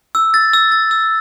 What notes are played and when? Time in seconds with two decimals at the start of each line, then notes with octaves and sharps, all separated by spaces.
0.15 E6
0.34 A6
0.53 E6
0.72 A6
0.91 E6